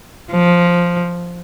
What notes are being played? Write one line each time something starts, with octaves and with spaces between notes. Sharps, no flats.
F3